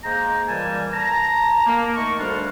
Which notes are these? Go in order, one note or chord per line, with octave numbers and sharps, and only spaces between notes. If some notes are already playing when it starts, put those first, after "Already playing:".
G#3 A#3 C5 A#5
A#2 E3 G3 G#5 A5
A5 A#5
A#3
D#3 A3 C#6
D2 G3 D4 F4